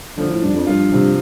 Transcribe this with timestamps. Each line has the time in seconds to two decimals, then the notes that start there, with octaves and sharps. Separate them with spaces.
0.17 D3 F3
0.30 A2
0.42 G2 D4
0.54 F2
0.67 G2 F4
0.91 G2 C3